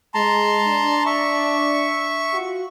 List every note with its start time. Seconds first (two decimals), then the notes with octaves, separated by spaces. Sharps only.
0.14 G#3 A5 A#5 C6
0.67 D4
1.06 E5 C#6
2.32 F4 F#4